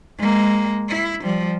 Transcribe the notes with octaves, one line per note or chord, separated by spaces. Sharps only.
G#3 A#3
E4
F3 G3